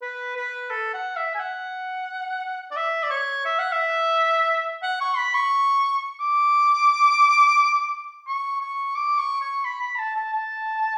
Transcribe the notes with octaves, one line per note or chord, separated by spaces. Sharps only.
B4
B4
A4
F#5
E5
G#5
F#5
D5
E5
D5
C#5
E5
F#5
E5
F#5
C#6
B5
C#6
D6
C#6
C#6
D6
C#6
C#6
B5
B5
A5
A5
A5